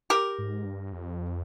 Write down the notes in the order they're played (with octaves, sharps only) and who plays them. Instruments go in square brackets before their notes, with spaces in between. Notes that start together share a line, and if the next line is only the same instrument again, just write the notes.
[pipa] G4 A#4
[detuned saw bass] G#2
G2
F2